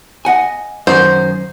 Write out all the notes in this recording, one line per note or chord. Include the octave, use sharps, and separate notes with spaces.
D#5 F#5 G#5
F#2 D#3 C5